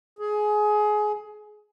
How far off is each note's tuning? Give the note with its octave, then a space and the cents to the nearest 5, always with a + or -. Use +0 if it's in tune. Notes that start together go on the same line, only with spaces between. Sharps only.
G#4 +20